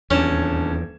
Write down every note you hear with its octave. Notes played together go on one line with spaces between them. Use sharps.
D#1 E2 C#4 D4 G#6 E7